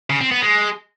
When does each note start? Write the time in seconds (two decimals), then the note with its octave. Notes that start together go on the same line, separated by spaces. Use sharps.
0.10 C#3
0.20 C4
0.31 B3
0.42 G#3